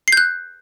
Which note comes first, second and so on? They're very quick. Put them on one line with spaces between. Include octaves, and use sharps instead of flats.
C7 G6 F#6